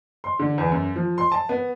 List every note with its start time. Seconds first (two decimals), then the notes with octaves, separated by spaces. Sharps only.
0.24 C6
0.39 D3
0.58 E2
0.72 F#2
0.96 F3
1.18 C6
1.32 A5
1.49 B3